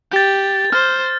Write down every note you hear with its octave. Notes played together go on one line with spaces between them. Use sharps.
G4 G6 A6
C5 F6